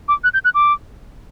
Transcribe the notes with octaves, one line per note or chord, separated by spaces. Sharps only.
D6
F#6
G6
F#6
D6